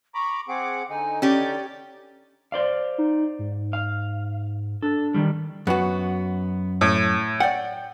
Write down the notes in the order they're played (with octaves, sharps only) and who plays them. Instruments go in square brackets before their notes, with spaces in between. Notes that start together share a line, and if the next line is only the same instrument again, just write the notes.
[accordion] A#5 B5 D6 [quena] C#6
[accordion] C4 G#4 D6 [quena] F#5
[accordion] D3 D#4 [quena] G#5
[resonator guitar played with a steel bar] C#4 G4 [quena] D5
[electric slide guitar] C5 D5 F5
[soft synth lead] D#4
G#2
[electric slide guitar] F5
[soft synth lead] D4 [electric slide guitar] A4
[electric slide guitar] D#3 G3
[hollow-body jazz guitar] F#2 F#4 [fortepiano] B3
[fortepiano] A2
[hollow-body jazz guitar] D5 F#5 [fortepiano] G5